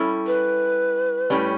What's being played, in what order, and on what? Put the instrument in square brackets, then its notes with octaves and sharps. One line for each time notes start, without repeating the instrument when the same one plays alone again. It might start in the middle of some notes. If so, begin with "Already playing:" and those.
Already playing: [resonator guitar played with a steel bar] G3 C#4 E4 A4
[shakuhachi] B4
[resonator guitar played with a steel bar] A2 G3 C#4